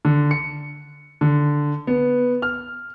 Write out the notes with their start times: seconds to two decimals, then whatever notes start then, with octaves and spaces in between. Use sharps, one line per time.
0.05 D3
0.31 C#7
1.21 D3
1.87 B3
2.42 F6